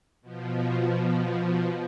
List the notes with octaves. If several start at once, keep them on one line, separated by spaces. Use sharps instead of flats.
B2 F3